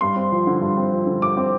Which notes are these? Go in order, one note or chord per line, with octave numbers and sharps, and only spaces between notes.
G2 C6
C4
F3
D3
G2
C4
F3
D3
G2 D6
C4